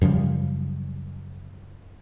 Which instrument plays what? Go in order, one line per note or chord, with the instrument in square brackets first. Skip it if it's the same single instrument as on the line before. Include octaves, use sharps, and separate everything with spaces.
[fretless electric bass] F#2 C#3 F3 G3